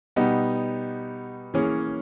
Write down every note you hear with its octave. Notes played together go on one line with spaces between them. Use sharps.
B2 G3 B3 D#4
E3 A#3 C#4 G#4 C#5